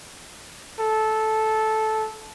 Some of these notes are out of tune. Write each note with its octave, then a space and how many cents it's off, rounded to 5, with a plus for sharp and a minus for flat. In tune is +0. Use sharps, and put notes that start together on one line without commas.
A4 -10